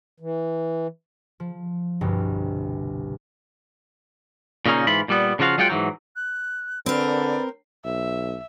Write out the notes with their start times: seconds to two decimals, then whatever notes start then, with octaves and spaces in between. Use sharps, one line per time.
0.20 E3
1.40 F3
2.01 G1 C2 G2 B2
4.66 A#2 C#3 A#3 C#4 D#4
4.87 G#2 E3 F4 B5
5.08 A#2 G3 B3
5.39 C#3 F3 F4 F#4 F5
5.58 F#3 G#3 F4 F#5 G5
5.70 G#2 E3 F#3
6.16 F#6
6.86 D3 C4 A#4 B4 D5
7.85 B1 E5